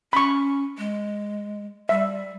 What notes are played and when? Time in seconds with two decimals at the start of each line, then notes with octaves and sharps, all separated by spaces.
0.13 C#4 B5 C#6
0.78 G#3
1.89 G3 E5